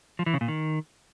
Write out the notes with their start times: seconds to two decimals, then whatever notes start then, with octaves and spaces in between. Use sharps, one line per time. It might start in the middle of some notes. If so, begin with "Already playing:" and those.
0.19 F3
0.26 E3
0.34 C#3
0.41 A#2
0.48 D#3